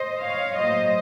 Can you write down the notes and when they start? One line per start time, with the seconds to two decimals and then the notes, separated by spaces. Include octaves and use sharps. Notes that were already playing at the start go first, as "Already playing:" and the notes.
Already playing: C5 D#5
0.22 C#5 F5
0.57 A2 F#3 A#3 C5 D#5